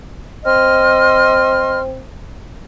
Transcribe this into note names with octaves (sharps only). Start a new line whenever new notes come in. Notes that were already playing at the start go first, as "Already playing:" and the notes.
C4 D#5 C6 F6